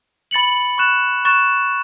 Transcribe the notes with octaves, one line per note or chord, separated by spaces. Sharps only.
B5 A6 C#7 F#7
C#6 F#6 A6 E7
C#6 F#6 A6 E7